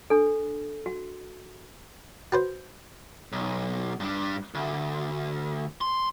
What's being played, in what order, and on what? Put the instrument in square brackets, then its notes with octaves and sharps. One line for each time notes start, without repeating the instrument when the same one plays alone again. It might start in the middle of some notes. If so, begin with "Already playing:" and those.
[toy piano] D4 A4
F#4
[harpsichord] F#4 B4 C5
[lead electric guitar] B1
G2 D4
D2
C6